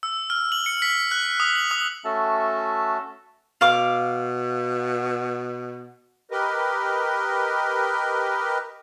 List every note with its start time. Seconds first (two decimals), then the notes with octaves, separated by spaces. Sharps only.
0.03 E6
0.30 F6
0.52 F#7
0.66 C#7
0.82 B6
1.11 F#6
1.40 D#6
1.56 F#7
1.71 D#6
2.04 A3 C#4 F#4 A4 E5 A5
3.61 B2 F5 D6
6.31 G4 A#4 B4 D#5